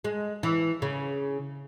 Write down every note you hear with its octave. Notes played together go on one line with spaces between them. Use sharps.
G#3
E3
C#3